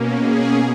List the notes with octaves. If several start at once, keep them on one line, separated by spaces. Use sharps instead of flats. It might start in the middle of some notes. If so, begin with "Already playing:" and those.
Already playing: B2 A#3 C#4
G#4